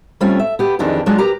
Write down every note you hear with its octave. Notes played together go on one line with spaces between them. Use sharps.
G3 A3 C4 C#4 F4
E5
B3 G4
F2 D#3 E3 D4 G4 G#4
F#3 G#3 D4 F4 F#4 G#4
G4 A#4 B4 A#5